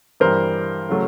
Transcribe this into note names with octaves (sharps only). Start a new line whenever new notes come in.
G2 E3 G3 A#4 C5
C#3 F#3 A3